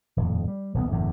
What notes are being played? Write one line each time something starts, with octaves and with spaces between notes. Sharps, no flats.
D#1 F2 A2
G3
D#1 B1 B3
F#1 E2 A2 D3